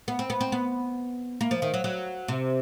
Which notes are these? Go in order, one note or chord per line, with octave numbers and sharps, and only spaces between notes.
B3
C4
B3
C4
B3
A#3
F3
D#3
F#3
F#3
C3